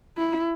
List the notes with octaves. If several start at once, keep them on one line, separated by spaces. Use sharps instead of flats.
E4